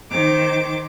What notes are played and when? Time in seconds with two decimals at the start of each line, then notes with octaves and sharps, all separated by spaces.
0.10 D#3 C5 D6